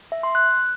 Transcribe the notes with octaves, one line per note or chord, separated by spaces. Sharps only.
E5
C6
F#6